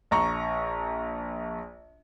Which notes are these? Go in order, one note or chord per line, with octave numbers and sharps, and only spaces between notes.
A#1 A#5 C#6